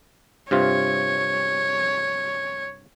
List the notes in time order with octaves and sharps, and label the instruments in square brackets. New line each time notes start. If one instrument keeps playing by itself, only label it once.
[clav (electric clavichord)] G2 C3 F4 [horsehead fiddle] C#5